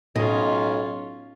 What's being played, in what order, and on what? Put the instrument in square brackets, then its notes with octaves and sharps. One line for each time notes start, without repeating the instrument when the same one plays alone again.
[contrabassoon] B1 [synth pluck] A2 [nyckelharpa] C#4 F4 [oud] D#5